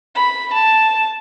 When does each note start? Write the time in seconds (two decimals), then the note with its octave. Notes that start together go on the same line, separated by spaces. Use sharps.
0.15 B5
0.53 A5